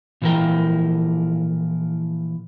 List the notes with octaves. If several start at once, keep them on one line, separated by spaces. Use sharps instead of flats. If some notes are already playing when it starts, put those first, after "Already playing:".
A#2 E3 F3 E4 A#4 G5